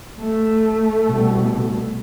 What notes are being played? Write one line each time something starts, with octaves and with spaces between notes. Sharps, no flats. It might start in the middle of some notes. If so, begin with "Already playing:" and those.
A3
C2 B2